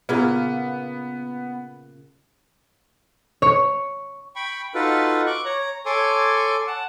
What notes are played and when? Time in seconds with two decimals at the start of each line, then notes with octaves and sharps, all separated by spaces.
0.09 A#2 C#3 A#3 B3
3.42 C#5
4.36 G5 B5 C#6
4.74 D#4 F4 F#4 A4 B4 F5
5.27 C#6 D6 F#6
5.45 C#5 A#5
5.86 A4 C#5 G#5 C6 D6
6.67 F#5 A5